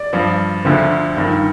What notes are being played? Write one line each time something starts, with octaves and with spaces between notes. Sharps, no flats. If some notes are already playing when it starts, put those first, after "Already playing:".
Already playing: D5
G2 F3
D2 D3 F3
G2 D#3